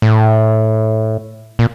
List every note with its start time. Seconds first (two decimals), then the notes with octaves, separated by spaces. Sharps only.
0.02 A2
1.59 A#2